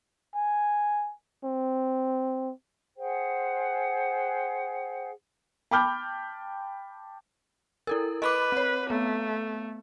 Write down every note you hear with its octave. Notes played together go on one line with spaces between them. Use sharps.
G#5
C4
G#4 C5 F#5 G5
G5 A5 B5 D6 F6 G6
E4 A4 A#4
B4 D#5 B5 D6
C4 C#5
A3 B3